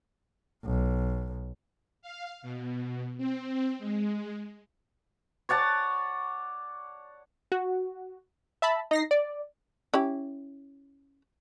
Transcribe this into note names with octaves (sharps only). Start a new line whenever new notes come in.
B1
F5
B2
C4
G#3
C#5 D5 F#5 A5
F#4
E5 A5 B5
D#4 A#6 C7
D5
C#4 E4 G4